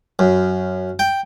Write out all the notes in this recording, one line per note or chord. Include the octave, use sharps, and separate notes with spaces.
F#2
G5